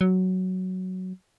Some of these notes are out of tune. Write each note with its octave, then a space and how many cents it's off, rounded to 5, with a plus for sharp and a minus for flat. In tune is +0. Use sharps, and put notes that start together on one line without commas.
F#3 +5